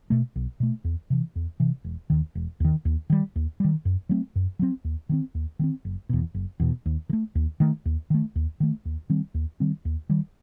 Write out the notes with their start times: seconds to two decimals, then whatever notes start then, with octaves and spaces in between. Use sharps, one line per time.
0.10 B2 A3
0.36 B1
0.60 B2 A3
0.84 E2
1.10 C3 E3
1.36 E2
1.60 C3 E3
1.84 E1
2.10 D#2 D#3
2.35 E1
2.60 D#2 D#3
2.85 D#2
3.10 D#3 G3
3.36 D#2
3.60 D#3 G3
3.85 F#2
4.09 F#3 A3 C4
4.36 F#2
4.59 F#3 A3 C4
4.84 D#2
5.09 D#3 A3 C4
5.35 D#2
5.59 D#3 A3
5.64 C4
5.85 F#1
6.09 E2 B2
6.34 F#1
6.60 E2 B2
6.86 D#2
7.09 D#3
7.13 A3
7.35 D#2
7.60 D#3 A3
7.86 D#2
8.10 D#3 A3
8.35 D#2
8.60 D#3 A3
8.85 D#2
9.10 D#3 G3 C4
9.34 D#2
9.60 D#3 G3 C4
9.85 D#2
10.09 D#3 G3